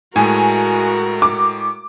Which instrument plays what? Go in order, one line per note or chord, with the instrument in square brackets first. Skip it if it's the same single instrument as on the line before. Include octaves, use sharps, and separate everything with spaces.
[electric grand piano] A2 G#3 A3 [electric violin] F#4 A#4 [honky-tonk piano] G#5
[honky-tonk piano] D6